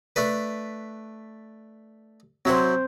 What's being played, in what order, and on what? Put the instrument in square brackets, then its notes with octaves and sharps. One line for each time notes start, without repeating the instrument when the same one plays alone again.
[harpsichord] A3 D4 B4
[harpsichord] F#3 E4 F#5 [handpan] C4 C5